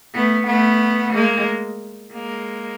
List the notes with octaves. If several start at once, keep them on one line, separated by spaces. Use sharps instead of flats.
A3 B3
A3 B3
G#3 A#3
G#3 A#3